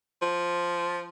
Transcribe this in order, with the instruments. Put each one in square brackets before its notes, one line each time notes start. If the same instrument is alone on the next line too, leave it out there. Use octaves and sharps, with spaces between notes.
[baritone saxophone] F3